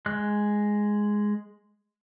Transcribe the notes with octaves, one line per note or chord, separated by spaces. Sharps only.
G#3 F#6